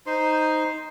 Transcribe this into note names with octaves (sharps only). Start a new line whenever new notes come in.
D#4 C5 C6